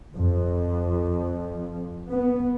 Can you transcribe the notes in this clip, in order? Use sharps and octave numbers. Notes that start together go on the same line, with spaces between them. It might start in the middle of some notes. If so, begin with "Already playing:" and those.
F2
B3